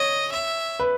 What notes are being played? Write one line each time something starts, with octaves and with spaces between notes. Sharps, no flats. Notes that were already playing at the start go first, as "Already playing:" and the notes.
Already playing: C#5 D#5
E5
B4